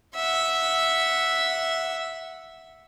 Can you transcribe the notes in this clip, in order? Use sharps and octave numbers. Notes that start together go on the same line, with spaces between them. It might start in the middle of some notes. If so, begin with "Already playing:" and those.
E5 F#5